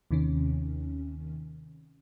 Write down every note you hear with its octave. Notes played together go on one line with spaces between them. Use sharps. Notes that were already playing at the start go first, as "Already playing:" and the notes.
D#2 C3 D#3 C#4